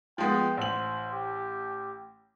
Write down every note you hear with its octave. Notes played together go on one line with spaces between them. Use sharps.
F3 G#3 B3 G5
A1 C5 F#7
G4